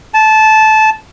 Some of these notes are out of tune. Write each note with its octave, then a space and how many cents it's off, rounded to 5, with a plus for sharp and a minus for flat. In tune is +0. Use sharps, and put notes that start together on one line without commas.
A5 -15